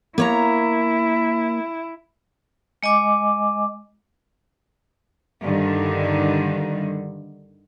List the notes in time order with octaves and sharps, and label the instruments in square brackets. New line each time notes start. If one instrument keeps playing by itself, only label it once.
[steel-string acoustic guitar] A#3 C#5 A#5 [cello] E4
[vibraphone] G#3 D#5 G#5 D6
[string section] G2 D3 D#3